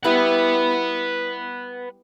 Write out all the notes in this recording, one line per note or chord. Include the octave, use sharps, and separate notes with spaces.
G3 B3 E4 B4 F#5